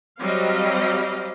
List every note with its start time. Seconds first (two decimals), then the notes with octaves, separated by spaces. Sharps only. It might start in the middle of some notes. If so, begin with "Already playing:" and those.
0.21 F#3 G3 C4 D#5 F5